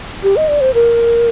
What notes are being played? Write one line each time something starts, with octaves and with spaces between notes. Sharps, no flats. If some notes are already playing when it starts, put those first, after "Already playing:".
G4
D#5
D5
C5
A#4